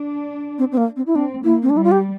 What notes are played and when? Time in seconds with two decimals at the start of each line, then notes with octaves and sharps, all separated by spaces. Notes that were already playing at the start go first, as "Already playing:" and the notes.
Already playing: D4
0.58 C4
0.72 C4
0.77 A#3
0.96 C4
1.07 E4
1.15 C4 D4
1.44 A#3 E4
1.62 C4
1.70 D4
1.73 G3 E4
1.84 F4
1.91 G4